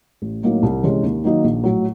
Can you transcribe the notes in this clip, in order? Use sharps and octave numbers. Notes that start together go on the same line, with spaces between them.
A1
A2 F#3 A#3 D#4
C2
C3 E3 G#3 C#4
D#2
D#3 F#3 A#3 D#4
A#1
A2 F#3